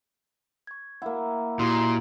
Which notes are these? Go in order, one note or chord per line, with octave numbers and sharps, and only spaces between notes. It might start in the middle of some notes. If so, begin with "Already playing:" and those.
C#6 G#6
A#3 E4 A#4 F#5
A#2 D#4 E4 F#4 G4 C6